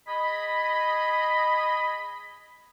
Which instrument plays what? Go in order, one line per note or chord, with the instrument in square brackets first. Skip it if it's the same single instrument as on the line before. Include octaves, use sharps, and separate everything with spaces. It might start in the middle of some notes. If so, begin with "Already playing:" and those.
[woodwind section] G#4 D#5 B5